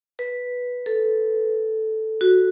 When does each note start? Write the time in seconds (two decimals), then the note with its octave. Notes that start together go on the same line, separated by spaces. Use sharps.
0.19 B4
0.86 A4
2.21 F#4